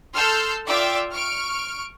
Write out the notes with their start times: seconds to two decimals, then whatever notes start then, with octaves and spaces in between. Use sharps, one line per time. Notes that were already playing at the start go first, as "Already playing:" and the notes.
0.15 A4 C6 E6 F6 G6 C7
0.67 F4 D5 E5 G5 D6 E6
1.12 C#6 F6 D7